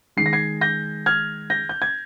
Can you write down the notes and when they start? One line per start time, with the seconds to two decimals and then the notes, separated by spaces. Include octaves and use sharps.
0.17 D#3 G#3 C7
0.26 A#6
0.33 G#6 C7
0.61 G6 A#6
1.06 F6 G#6
1.50 G6 A#6
1.69 G6
1.82 G#6